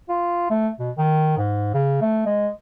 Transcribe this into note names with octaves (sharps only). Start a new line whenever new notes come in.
F4
A3
B2
D#3
G#2
C#3
A3
G#3